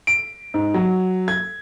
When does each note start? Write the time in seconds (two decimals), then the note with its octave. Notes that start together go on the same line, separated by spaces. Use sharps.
0.07 D7
0.54 G#2
0.74 F#3
1.28 G#6